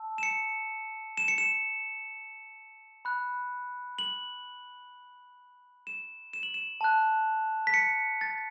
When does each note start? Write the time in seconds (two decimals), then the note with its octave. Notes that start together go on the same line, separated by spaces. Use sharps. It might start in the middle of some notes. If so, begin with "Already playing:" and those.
Already playing: A5 E6
0.18 E7
0.23 C#7
1.17 E7
1.28 C#7
1.38 E7
3.05 B5 F#6
3.99 F#7
5.87 E7
6.33 E7
6.43 F#7
6.54 E7
6.81 A5 F#6
7.67 B6
7.74 C#7
8.21 A6